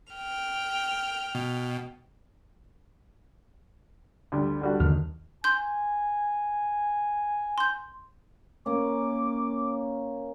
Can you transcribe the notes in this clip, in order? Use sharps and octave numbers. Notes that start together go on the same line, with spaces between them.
G5 F6
B2
D2 G3
D3 G3 F#4
D#2 D3 D#3 F6
G#5 C6 G6
C6 G6
A#3 C#4 D6